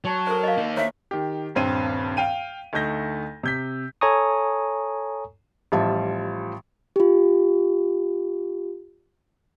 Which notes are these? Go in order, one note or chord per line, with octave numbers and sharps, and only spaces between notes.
F#3 C#5 A5 C#6
A4 A#4 C5
D#5 F5
A#3 D#4
D#2 C5 C#5 E5
D#3 G4
D#1 G2 C4 D#7
F5 G5 D#7
D2 A3 D#4 G6 A#6
C3 G6 B6
A4 C#5 G#5 A#5 C#6 D#6
A1 F3 G3 F4 E5 A5
F4 G4